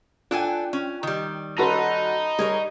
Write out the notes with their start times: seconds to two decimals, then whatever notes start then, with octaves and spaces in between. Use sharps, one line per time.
0.31 D4 F4 A4 G5 G#5 F#6
0.73 C#4
1.03 D#3 G3
1.58 C#4 D#4 F#4 A4 A5 B5 C6
2.39 G3 G#4 A#4 C#5